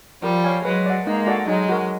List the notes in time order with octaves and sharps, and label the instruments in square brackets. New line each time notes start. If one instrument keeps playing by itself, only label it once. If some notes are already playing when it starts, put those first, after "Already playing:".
[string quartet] F3 G3 [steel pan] A#4
[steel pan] C#5 F5 G#5
[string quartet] F#3 G#3 [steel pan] B4
[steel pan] D5 F#5
[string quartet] G#3 A#3 [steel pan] D#4
[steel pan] F#4 A4 D5 F#5
[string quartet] F#3 G#3 [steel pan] D#4
[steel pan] F#4 A#4